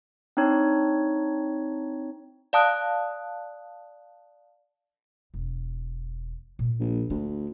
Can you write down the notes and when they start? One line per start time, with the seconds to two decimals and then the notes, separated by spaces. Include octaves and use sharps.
0.37 C4 D4 D#4 C#5
2.53 D5 F5 A5 D#6 F#6
5.34 E1
6.59 A#2
6.80 A#1
7.10 D2 D4